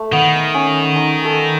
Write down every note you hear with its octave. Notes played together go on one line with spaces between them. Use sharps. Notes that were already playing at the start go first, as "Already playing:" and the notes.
Already playing: A3
D#3 B3
C#4
D#4
A4